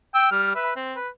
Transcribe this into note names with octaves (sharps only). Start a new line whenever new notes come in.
G5 E6
G3 F6
B4 E5
C4
B4